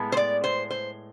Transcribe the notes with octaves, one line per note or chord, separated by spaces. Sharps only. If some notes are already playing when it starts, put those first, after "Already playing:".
Already playing: A2 G#3 B3
C5
D5
C5
C5